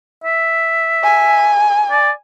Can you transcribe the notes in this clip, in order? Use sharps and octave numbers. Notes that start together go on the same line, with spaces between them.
E5
G#5
D5